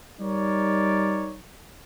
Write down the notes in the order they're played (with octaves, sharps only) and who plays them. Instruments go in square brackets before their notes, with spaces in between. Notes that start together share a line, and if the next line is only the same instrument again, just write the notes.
[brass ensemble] G3 D#4 A#4 C#5 D5